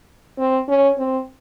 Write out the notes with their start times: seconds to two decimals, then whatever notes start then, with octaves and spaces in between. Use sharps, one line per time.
0.38 C4
0.68 C#4
0.98 C4